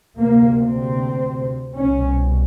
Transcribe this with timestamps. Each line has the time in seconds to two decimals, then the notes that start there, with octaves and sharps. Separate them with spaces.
0.17 D2 C3 A#3
0.57 C4
1.76 C2 B2 C#4